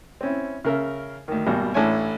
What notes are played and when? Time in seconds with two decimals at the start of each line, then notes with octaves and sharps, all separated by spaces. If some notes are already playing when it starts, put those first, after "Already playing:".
0.21 C4 C#4 E4
0.65 C#3 A#4 E5
1.28 D2 D#3
1.46 G#1 B2 G3 A#3
1.74 A1 A3 D4 E4 C#5 G#5